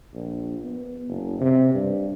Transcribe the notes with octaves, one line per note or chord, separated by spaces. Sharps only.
A#1
B3
F#1
C3
G2